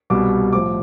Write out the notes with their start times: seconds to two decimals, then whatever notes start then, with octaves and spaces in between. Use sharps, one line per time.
0.10 C2 B2 G3 D6
0.53 A2 F3 D6